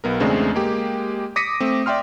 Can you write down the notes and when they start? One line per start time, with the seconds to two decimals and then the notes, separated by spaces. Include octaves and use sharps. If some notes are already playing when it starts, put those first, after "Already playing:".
0.04 B1 B3 A#4
0.20 E2 C#3 G#3 A3 C4 D4
0.55 G#3 A#3 G4
1.36 D6 D#6 A#6 B6 C#7 D#7
1.60 A3 C4
1.86 D5 E5 G5 C6 F6